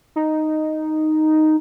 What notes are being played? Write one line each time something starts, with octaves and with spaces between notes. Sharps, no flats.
D#4